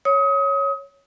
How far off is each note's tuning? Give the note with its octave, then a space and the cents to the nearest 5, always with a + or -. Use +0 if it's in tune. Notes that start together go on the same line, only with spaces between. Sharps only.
C#5 +0 D#6 +30